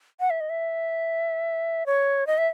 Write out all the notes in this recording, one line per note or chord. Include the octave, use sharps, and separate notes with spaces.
F#5
E5
D#5
E5
C#5
D#5
E5